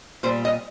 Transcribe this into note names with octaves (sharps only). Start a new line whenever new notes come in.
A#2 G3 C5
D#5